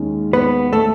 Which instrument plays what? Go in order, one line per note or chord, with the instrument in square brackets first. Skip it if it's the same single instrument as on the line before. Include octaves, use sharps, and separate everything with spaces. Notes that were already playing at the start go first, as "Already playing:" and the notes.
Already playing: [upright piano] D#2 D#3 G#3 C#4
[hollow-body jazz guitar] B3 B4
A3 A4